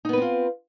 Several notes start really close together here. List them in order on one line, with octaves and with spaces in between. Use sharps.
D#4 B3 B4 C4 F4